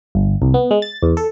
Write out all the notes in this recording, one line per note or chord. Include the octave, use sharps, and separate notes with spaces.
G1
C2
B3
G#3
A6
E2
A4